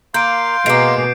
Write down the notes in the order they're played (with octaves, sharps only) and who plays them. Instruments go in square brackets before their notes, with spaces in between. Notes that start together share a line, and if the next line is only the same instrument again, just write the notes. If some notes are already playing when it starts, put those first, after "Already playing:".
[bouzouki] A#3 [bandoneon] F5 C6 [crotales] G6 D7
[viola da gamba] B2 [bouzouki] G#3 A#3 [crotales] D6 C7 D7